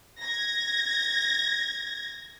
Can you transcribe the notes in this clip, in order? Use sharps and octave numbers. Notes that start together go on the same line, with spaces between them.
G#6 A#6